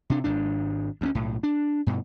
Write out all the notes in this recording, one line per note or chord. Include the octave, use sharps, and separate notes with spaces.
C3 D4
G#1 G#2 D4
D2 B3 C#4
B1 A2
D4
G2 B2